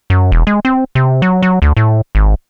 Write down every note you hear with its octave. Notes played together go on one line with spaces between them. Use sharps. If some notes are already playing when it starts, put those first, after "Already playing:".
F#2
E1
G#3
C4
C3
F#3
F#3
D2
A2
G#1